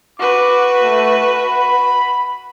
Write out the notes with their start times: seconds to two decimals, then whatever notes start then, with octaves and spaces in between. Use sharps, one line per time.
0.19 F#4 B4 D6
0.83 A3
1.32 B5